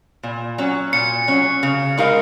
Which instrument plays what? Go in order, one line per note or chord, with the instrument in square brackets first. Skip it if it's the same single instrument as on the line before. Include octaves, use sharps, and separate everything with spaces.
[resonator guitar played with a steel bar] A#2
F#3 C#4
[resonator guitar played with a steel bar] A#2 [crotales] C#7
[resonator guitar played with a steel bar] F#3 C#4
C#3
G#3 D#4 A#4 F5